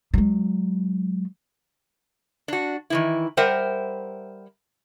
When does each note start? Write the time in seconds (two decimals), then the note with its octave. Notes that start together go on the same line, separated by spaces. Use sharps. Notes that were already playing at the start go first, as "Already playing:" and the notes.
0.14 F#3 G#3
2.48 D4 F#4
2.90 D#3 E3 E4
3.37 G3 A#4 C5 E5 F#5 G5